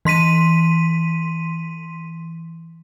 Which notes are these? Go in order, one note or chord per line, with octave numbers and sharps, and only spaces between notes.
E3 C6 B6 D#7